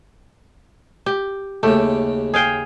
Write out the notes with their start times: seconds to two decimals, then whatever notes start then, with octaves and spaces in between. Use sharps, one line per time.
1.06 G4
1.63 D#2 C#3 A3 G4
2.34 G#4 F5 G5